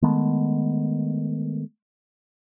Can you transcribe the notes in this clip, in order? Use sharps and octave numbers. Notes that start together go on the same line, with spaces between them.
D#3 G#3 A3 B3